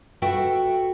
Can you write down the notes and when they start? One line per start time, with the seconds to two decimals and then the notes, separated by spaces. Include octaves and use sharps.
0.22 F#4 A4 B4 E5 G5